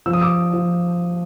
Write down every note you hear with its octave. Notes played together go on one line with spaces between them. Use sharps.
F3 E6
D#6
D6 E6
F3